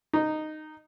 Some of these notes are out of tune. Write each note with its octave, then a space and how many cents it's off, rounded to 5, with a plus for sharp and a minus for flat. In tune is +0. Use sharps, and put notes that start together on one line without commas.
D#4 -10